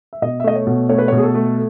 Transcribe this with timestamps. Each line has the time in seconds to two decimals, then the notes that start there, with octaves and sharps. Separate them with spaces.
0.13 E5
0.22 B2 D#5
0.40 E5
0.44 A3 D#5
0.56 C#5
0.67 B2
0.89 A3 C#5
0.98 B4
1.08 B2 C#5
1.18 G#4
1.24 A4
1.35 A3